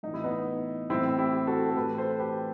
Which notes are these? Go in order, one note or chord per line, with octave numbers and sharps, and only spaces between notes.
A2 E3 D#4
E4
B3 D#4
A2 E3 C4 E4
E4 G4
F#4 A4
A4
A2 E3 G4 B4
A4 C5
G4 B4